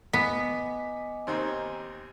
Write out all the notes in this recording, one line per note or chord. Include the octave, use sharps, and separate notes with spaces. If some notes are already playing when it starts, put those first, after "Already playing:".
B3 D#5 G#5 D6 B6
D#2 D#3 C4